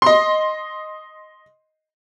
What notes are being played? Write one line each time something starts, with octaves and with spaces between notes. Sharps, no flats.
D#5 C6